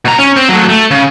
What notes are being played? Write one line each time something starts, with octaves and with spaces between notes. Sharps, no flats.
B2 A#5
C#4
C4
F#3 A3
A3
C#3